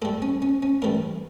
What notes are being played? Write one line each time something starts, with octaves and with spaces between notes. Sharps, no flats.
A2 G3 A4
C#4
C#4
C#4
A2 E3 G3 A#4